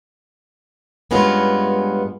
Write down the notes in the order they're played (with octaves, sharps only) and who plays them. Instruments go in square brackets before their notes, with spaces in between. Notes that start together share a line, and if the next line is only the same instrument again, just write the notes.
[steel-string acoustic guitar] G2 G#3 B3 C#4 F4